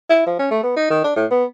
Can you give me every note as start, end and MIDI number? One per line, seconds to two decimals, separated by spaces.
0.10 0.26 64
0.26 0.39 53
0.39 0.47 61
0.51 0.62 57
0.64 0.73 59
0.77 0.89 63
0.90 1.02 51
1.04 1.14 62
1.16 1.25 45
1.31 1.44 59